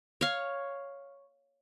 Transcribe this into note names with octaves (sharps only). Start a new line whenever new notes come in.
C#5 F5